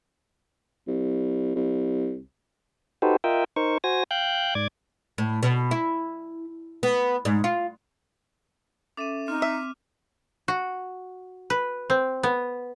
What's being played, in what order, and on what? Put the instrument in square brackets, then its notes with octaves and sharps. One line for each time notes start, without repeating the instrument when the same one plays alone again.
[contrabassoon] C2
C2
[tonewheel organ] D#4 F#4 G4 A4 B4 C5
F4 A#4 D#5 E5 G5
D#4 A#4 C5 C#6
F#4 C5 G#5 A#6
F5 G5 F#6 G6
G#2 D5 D6 G#6
[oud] A2
B2
E4
B3
G#2
F4
[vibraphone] C#4 A4 E5 [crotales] D6 D#7
[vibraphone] C4 [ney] D#4 [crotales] F6
[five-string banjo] E5
[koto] F#4
B4
C4
B3